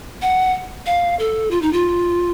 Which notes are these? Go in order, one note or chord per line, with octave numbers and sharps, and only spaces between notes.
F#5
F5
A4
F4
D#4
F4